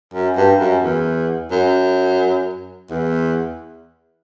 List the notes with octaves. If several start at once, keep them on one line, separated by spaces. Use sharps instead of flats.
F#2
G2
F#2
E2
F#2
E2